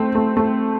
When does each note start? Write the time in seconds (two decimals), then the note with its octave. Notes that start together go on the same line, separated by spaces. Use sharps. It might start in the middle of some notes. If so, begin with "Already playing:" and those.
Already playing: A3 C4
0.15 A3
0.37 A3